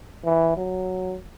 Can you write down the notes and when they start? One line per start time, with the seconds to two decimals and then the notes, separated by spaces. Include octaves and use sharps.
0.25 E3
0.57 F#3